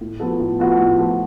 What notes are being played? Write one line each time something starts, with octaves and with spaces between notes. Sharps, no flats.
A2
F3 B3 F#4 A4
A2
F3 B3 F#4 A4
A2
F3 B3 F#4 A4